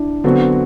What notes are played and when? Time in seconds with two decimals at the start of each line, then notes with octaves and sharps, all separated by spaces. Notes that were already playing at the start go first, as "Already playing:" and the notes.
Already playing: D4 E4
0.24 D3 F#3 B3 C4 F#4